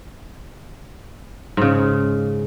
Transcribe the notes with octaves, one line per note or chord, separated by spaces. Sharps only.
G#2 C#3